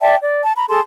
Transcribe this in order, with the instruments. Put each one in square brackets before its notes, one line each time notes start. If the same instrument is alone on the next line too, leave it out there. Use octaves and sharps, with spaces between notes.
[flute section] D5 E5 G5 A5
D5
A5
A#5 B5
G#4 A4 A5 C6